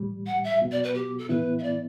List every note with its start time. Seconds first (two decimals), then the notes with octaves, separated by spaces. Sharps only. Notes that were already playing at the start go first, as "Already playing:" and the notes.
Already playing: A2 E3 G3
0.27 F#5
0.44 E5
0.60 B2 F#3 B3 F#4
0.72 D5
0.84 B4
0.95 G4
1.18 A4
1.29 A2 E3 B3 E4 B4
1.59 E5
1.63 D5